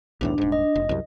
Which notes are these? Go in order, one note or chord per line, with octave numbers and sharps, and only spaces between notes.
B1 E2 A2 D4
D#1 G#2
D#5
F1
C2 F#2